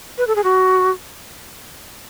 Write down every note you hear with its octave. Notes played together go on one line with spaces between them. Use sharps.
B4
A4
G#4
F#4